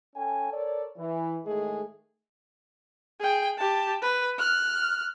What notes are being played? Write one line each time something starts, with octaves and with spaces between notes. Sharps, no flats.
C#4 A4 G5 G#5
A4 A#4 C#5 D5
E3
A2 D#3 G#3 A3 G#4
G#4 G5
G4 A5
B4
F6 F#6